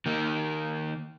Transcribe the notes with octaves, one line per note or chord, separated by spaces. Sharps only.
D#3 A#3